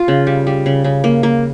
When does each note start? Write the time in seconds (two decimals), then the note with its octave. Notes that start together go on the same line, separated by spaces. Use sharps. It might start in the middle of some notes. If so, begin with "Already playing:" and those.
Already playing: F4
0.08 C#3
0.27 G3
0.47 G3
0.66 C#3
0.84 C#3
1.04 A#3
1.23 A#3